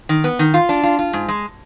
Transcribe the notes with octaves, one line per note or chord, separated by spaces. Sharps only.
D#3
B3
D#3
F4
D4
F4
F4
G#2
G#3